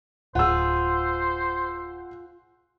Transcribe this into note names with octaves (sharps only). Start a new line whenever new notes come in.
D1 F4 G#4 C5 F#5 E6